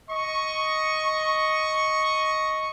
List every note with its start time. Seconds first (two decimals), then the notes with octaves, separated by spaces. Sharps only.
0.10 D#5 C#6